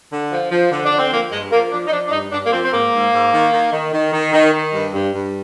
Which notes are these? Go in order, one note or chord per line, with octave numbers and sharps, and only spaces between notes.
D3
F3
F3
D3
D4
D3
C4
F3 A#3
G2 G#3
F3 A#3
F3 D4
D#4
F3 D4
D4
G2 D#4
G2 D4
A#3
F3 C4
C4
G#2 A#3
G#2
G#2
D#3
D#3
D#3
D#3
D#3
D#3
D#3
G2
G2
G2